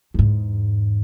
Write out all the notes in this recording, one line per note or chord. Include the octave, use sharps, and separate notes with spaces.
E2 G#2